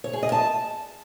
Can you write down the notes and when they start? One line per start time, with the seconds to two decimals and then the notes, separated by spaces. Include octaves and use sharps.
0.04 C#5
0.13 G#4
0.23 D#5
0.32 A5